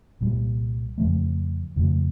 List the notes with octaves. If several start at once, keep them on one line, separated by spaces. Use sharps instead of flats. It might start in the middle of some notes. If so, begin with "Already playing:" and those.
C2 A#2 G3
F2 C#3 F3 A3
F2 C#3 F3 A3